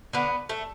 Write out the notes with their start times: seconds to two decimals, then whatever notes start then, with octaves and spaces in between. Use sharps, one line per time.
0.13 D3 B3
0.49 A3